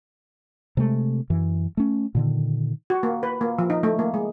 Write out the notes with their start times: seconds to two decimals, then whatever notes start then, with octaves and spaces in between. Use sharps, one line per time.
0.77 C3 G#3 A3
1.30 F#2 E3
1.77 A3 C#4
2.15 A#2 D3 D#3
2.90 F#4
3.03 A#3
3.23 B4
3.41 A#3
3.59 F3
3.70 D#4
3.83 A3
3.99 A#3
4.14 G#3